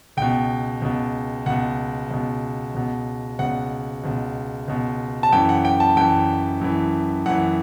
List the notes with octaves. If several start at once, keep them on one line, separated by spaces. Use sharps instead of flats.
C#2 B2 G5
C#2 B2
C#2 B2 F#5
C#2 B2
C#2 B2
C#2 B2 F#5
C#2 B2
C#2 B2
A5
F#2 E3 G5
F#5
G5
A5
F#2 E3 G5
F#2 E3
F#2 E3 F#5